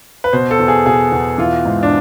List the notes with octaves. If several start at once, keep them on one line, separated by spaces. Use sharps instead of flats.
B4
B2 C5
A4
E2
G#4
B2 G#4
E2
E3 F4
G#2
D4